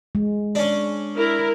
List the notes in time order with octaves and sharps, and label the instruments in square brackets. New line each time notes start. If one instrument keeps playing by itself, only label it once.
[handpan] G#3
[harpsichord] C#4 D4
[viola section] E4 A#4